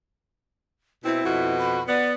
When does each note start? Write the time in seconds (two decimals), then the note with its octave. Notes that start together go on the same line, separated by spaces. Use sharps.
1.04 B2 C4 E4
1.24 F2 B2 F#4
1.59 B5
1.88 B3 D5